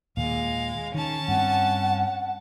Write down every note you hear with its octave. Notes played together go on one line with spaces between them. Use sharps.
D#2 A#2 G#3 F5
D#3 C#4 A5
G2 C4 F#5